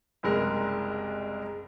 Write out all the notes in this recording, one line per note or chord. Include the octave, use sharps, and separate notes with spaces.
F#1 C2 G#3 A#4